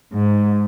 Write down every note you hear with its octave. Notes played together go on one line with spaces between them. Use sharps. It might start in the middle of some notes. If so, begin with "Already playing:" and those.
G#2